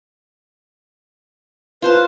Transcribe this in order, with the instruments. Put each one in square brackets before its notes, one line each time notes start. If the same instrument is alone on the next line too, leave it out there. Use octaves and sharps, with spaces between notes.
[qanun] F4 C5 A5 [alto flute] B4